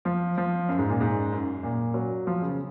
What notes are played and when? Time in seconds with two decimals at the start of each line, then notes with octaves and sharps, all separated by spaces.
0.05 F3
0.37 F3
0.68 F#2
0.78 G#2
0.89 A#2
1.00 G#2
1.32 F#2
1.63 A#2
1.94 F#3
2.27 F3
2.42 C#3